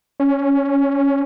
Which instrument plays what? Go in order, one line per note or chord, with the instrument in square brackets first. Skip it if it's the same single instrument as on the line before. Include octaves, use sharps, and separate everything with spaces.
[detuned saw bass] C#4